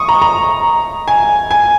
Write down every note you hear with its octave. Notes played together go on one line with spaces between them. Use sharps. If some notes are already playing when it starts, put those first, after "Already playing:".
Already playing: C#6 D#6
A#5
A#5
G#5
G#5